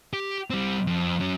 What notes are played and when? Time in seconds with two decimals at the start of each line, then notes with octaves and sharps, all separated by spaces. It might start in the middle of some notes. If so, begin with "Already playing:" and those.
0.13 G4
0.50 G3 C4
0.87 F2
1.20 F#3 C#4